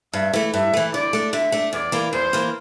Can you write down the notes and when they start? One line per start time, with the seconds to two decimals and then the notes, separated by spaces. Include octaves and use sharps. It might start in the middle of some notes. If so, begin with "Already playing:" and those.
0.13 G2 E5
0.33 E3 A3
0.54 G2 E5
0.73 E3 A3
0.93 D3 D5
1.13 A3 D4
1.33 D3 E5
1.52 A3 D4
1.73 E2 D5
1.92 E3 A#3
2.12 E2 C5
2.33 E3 A#3